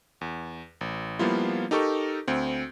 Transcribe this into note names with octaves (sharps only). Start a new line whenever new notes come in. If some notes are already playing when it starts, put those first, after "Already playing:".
E2
A1
F3 G3 A#3 B3 E4 F4
D#4 G4 A4 A#4 C#6
D2 C4